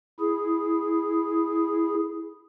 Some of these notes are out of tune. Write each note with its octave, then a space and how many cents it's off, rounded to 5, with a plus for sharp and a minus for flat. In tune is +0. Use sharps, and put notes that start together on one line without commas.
E4 +0 G#4 +0